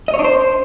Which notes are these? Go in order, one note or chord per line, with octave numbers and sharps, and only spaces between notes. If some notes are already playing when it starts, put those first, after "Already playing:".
D#5
C#5
D4
C5